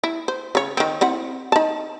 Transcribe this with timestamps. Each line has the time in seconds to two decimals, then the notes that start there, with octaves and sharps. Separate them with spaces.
0.04 E4
0.28 C5
0.55 C#3 C#5
0.77 D#3 C4
1.01 C4 E4 F#5
1.52 D#4 A5